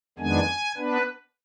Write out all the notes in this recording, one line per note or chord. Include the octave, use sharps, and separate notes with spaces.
F2 D#3 G#3 B3 D4 G#5
B3 D4 B4